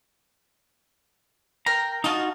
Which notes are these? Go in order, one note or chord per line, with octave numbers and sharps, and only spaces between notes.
A#4 G5 A#5
D#4 F4 F#4 D#5 A5